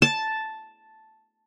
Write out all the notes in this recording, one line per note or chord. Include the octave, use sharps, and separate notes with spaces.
A5